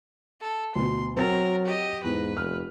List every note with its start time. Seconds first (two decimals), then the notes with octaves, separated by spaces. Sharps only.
0.41 A4
0.75 D2 B2 C6
1.17 F#3 C4 A#4 A6
1.66 G4 D#5
2.04 E2 G#2 B4
2.37 F1 F6